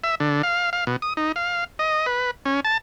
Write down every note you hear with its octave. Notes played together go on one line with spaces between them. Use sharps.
E5
D3
F5
F5
B2
D#6
D#4
F5
D#5
B4
C#4
A5